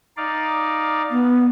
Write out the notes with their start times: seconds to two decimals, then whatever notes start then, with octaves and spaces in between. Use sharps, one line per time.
0.17 D#4 D5 F5
1.10 B3